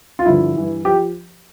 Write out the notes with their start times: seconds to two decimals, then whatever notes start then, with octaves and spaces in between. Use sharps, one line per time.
0.19 F4
0.26 G2 D3 F3 E4
0.55 G2 E3
0.85 F3 G4